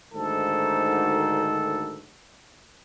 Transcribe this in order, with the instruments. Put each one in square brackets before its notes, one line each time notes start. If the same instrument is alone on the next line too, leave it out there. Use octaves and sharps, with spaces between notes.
[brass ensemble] D2 G#2 D#3 [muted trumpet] A4